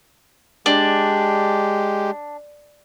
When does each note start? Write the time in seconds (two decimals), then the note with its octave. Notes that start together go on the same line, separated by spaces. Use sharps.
0.66 G#3 D4 G4